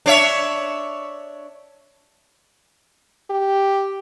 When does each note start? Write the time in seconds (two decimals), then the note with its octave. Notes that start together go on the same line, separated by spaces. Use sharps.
0.06 D4 C#5 E5
3.30 G4